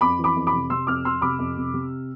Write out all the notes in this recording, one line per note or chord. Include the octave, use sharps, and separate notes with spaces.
F2 B5 D6
E3
B5 D6
F2
B5 D6
C3
C3 C6 E6
F2 D6 F6
F2 C6 E6
C3 B5 D6
F2
C3
C3